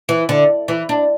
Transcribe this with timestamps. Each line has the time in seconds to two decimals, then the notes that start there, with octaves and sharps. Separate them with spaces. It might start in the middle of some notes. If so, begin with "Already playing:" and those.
0.09 E3
0.29 D3
0.68 E3
0.89 D4